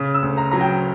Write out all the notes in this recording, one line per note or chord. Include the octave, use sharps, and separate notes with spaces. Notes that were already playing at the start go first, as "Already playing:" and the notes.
Already playing: C#3
E6
D2
A#5
F#3 A#5
G5